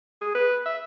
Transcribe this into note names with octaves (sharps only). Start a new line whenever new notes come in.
G#4
B4
E5